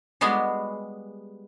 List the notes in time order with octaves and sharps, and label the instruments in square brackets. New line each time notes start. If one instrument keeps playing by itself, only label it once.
[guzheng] G3 G#3 B3 F#4 G#4